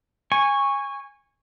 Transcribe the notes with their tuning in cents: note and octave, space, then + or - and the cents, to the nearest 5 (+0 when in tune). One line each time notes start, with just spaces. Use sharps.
G#5 -20 C#6 +0